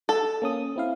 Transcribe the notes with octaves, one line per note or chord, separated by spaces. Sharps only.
A4
A#3 C#4 D#6
C4 E4 F5